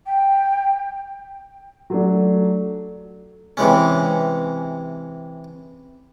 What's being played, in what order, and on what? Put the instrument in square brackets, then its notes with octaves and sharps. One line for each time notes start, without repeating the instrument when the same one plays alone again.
[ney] G5
[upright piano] F#3 A3 D4
[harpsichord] C3 E3 G#3 C#4